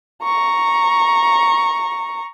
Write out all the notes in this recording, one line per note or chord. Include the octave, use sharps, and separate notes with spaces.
A#5 C#6